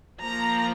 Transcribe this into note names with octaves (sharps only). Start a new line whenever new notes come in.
F3 A#3 A#5